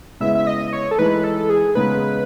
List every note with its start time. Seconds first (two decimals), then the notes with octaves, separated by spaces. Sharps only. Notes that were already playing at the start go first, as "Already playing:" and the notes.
0.20 C#3 G#3 B3 E4 E5
0.35 E5
0.47 D#5
0.73 C#5
0.91 A4
0.98 E3 G#3 D#4 B4
1.24 A4
1.50 G#4
1.75 C#3 G#3 B3 D#4 B4